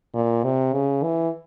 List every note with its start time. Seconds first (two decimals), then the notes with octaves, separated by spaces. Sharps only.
0.14 A#2
0.44 C3
0.73 C#3
1.03 E3